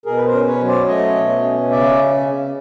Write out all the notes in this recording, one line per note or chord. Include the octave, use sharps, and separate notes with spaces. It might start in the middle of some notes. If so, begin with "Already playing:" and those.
B2 G#4 A#4
B4
A#4 C5
C#4
B4 C#5
F#3
C5 D5
A3 C#5 D#5
B2
C#4
C#3 D5 E5